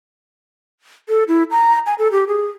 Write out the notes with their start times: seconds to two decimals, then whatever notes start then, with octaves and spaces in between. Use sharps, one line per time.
1.09 A4
1.28 E4
1.51 A#5
1.86 G#5
1.99 A4
2.12 G4
2.28 G#4